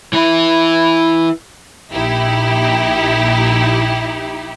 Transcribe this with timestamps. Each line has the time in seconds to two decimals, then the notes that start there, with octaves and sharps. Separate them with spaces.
0.13 E3 E4
1.91 A#1 D#4 E4 G4